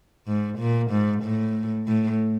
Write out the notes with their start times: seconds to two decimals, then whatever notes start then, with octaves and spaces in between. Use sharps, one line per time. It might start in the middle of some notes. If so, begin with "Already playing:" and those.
0.27 G#2
0.59 A#2
0.91 G#2
1.23 A2
1.87 A2